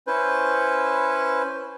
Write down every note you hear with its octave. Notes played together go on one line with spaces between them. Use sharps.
C#4 E4 B4 C5